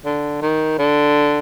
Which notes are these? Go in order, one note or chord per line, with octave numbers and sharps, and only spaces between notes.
D3
D#3
D3